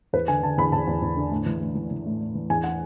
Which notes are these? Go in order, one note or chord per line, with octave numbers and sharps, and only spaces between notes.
E2 B4
D3 G#5
D3 A5
E2 B5
E2 A5
E2
E2
D3
A2
E3
A2
E3
E3
A2
A2
E3
E2 G#5
F#5